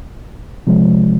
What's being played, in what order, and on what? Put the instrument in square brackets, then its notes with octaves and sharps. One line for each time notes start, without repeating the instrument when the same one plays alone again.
[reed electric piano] C3 F3 G#3